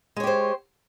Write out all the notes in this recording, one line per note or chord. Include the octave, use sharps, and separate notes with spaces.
G#3 G4 C5 C#5